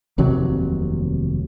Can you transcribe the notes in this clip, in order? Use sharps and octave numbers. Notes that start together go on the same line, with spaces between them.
F1 D#2 C3 F#3